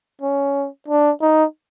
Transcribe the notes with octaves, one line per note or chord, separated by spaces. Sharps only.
C#4
D4
D#4